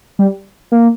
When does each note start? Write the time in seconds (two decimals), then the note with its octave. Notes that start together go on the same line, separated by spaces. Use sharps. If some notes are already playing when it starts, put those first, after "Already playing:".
0.19 G3
0.72 A#3